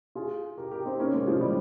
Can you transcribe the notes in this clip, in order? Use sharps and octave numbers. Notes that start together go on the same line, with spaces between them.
F4 G#4
G4 A#4
G4 A#4
C4 D#4
A#3 C#4
G#3 C4
F3 G#3
D#3 G3